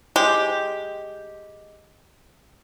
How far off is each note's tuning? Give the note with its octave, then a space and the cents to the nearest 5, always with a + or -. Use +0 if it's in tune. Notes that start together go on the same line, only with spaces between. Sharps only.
G#3 +0 G4 +0